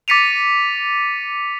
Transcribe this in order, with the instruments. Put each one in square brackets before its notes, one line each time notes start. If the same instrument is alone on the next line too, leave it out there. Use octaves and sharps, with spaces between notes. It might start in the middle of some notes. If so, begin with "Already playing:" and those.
[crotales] D6 A6 B6 C#7 D#7 F7